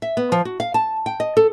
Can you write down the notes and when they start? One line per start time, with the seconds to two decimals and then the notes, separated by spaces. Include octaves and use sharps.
0.02 E5
0.17 B3
0.32 F3
0.45 F#4
0.60 F5
0.74 A5
1.06 G5
1.20 D#5
1.37 A4